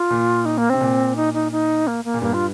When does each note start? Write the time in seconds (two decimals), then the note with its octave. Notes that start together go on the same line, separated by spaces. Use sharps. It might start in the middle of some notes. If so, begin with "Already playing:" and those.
Already playing: F4
0.10 A#2
0.45 D#4
0.58 A#3
0.70 C3 C4
0.81 A#2
1.16 D#4
1.34 D#4
1.52 D#4
1.87 A#3
2.05 A#3
2.14 A#2
2.22 G2 A#3
2.33 F4